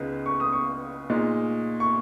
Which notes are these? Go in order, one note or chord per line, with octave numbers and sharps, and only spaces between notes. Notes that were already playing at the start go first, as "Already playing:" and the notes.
Already playing: C#2 C#3 G#3 B3 D#4
C#6
D#6
C#6
A#2 G#3 D#4
C#6